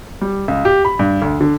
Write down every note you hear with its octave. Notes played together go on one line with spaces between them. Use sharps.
G3
C#2
G4
B5
G2
D2
D3